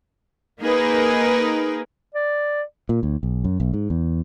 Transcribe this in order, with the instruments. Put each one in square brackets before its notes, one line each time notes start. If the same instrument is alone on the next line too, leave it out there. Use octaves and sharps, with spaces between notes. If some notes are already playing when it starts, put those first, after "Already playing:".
[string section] A#3 D#4 G#4 A#4 B4
[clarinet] D5
[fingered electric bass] A#2
D2
B1
F#2
B1
G#2
E2